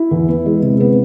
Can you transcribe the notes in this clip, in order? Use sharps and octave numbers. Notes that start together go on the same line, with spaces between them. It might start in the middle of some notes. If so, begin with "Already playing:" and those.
Already playing: E4
E2
B3
G#3
C3
B3